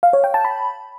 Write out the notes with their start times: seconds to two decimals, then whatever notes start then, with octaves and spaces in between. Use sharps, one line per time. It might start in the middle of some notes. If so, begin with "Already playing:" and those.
0.03 F5
0.13 C#5
0.24 G5
0.34 A5
0.45 B5